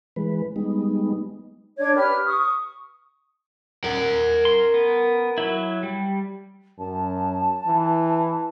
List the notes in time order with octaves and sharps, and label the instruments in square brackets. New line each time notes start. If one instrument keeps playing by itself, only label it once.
[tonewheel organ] E3 G#3 B4
G3 G#3 B3 D#4
[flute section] D4 C#5 D5 G#6
G4 B4 F6
C#6 D#6
[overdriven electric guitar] A#4 F#5
[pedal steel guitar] C6
B3
F#3 E4
G3
[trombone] F#2 [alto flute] A5
[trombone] E3